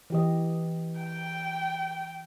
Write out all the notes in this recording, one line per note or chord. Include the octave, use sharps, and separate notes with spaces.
E3 G4 D#5
G5